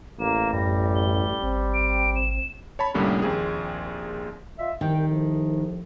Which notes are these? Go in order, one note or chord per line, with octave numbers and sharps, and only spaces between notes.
A1 A#3 E7
F#2 G3 A#6
G7
G#1 C4
D7
E7
C#5 A5 B5
C2 A2 D3 G3 A#3 C#4
A#1 D#2 C4 G#4
F4 D#5 E5
C2 D#3 G5
C2 A2 F3